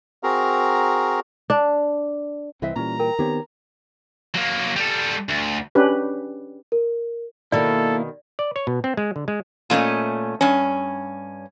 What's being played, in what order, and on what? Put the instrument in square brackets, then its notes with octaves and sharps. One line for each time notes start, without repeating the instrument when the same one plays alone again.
[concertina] C4 F#4 G#4 A#4 A#5
[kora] D4
[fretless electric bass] C2 E3 [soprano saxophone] C4 [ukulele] B4 D#5 E5
[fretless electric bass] A#2 E3 G3 [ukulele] C#4 [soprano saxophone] A#5
[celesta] A#4 [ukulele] G5
[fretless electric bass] D#3 B3 C4 [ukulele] G4 C#5
[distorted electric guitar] F#3 A#3
G3 A4
D2
[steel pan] C#4 D4 G4 B4
[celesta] A#4
[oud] B2 D#3 [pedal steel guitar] A#3 E4 [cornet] A4 [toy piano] D5
[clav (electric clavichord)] D5
C#5
B2
C4
G#3
D3
G#3
[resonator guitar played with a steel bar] A#2 A3 C#4 D#5
G2 C#4